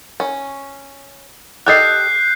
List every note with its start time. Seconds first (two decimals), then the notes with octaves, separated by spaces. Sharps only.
0.20 C#4
1.67 G4 A4 D#5 F#6 G6 C7